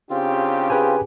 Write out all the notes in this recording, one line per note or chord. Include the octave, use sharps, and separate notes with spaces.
C#3 C4 D4 F4 G4
G#4 B4 G#5